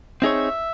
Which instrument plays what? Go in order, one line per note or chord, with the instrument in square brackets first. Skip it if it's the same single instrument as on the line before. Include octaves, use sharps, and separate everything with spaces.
[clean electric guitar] C4 D#4 G#4 C#5 [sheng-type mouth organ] E5